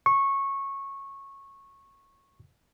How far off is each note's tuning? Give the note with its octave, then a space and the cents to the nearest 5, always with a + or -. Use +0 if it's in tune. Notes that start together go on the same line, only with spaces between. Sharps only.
C#6 -15